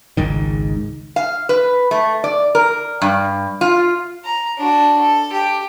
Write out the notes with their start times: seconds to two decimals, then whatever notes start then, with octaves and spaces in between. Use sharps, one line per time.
0.17 G#1 C#2 G#2 D#3
1.16 F5
1.49 B4
1.91 A3
2.24 D5
2.55 A#4
3.02 G2
3.61 F4
4.25 A#5
4.58 D4 F#4
5.01 A4
5.32 G4